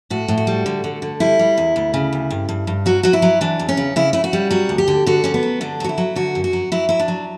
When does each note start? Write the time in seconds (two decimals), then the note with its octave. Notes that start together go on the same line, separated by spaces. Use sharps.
0.10 A2 F#4
0.28 A2
0.38 F#4
0.47 G3
0.66 D3
0.84 D3
1.02 D3
1.20 G3 E4
1.39 G3
1.58 E2
1.76 D2
1.94 C#3
2.13 D2
2.30 G2
2.49 G2
2.67 G2
2.86 F#3 F#4
3.03 F#3 F#4
3.13 E4
3.22 F#3
3.41 E3 D4
3.59 E2
3.69 C#4
3.77 C#3
3.96 C#3 E4
4.13 C#3 E4
4.24 F#4
4.33 G3
4.51 F#3 F#4
4.69 D2
4.78 G4
4.88 D3
5.06 D3 F#4
5.24 D3 C#4
5.34 B3
5.43 F#3
5.61 D3 D4
5.80 F#3 F#4
5.89 E4
5.98 F#3
6.16 D3 F#4
6.35 F#2
6.44 F#4
6.53 F#3
6.72 F#3 E4
6.89 F#3 E4
6.99 D4
7.08 F#3